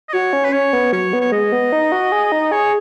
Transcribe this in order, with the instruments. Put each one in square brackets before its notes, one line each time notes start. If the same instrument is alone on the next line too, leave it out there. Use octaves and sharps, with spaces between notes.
[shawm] D#5
[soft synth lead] F#4 [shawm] C#5
[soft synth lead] C#4
[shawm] B4
[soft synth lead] C#4 [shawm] C#5
[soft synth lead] B3
[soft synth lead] F#3 [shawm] C#5
[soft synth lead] B3
[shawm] C#5
[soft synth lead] G#3 [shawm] D#5
[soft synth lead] B3
D#4
F#4
G#4
D#4
[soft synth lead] G#4 [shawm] C#5